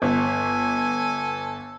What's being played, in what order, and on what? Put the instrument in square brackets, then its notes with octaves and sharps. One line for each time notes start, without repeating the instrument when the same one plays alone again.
[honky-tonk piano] G1 [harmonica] A4 G#5